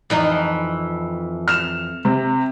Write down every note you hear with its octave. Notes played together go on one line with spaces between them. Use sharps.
F2 E3 D#4
F6 E7
C3